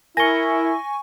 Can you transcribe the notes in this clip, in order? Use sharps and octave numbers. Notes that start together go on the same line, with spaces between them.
E4 A#4 G#5 C#6 A#6 G7